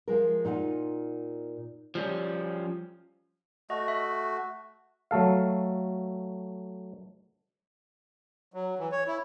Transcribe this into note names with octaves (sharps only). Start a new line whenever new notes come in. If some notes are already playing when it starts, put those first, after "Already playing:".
F3 G#3 A#4
A#2 D#4 F4 F#5
F3 G3 C#4
A3 F#4 D#5
E5
F#3 A3 A4 F5
F#3
E3
C#5
E4